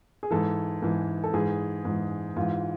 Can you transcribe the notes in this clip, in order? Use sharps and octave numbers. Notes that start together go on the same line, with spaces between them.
G#4
G#2 E3 A4
G#2 E3
A4
G#2 E3 G#4
G#2 E3
G#2 E3 F4